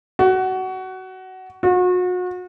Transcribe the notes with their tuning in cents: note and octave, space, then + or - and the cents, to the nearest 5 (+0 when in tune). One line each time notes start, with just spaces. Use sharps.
F#4 +20
F#4 -35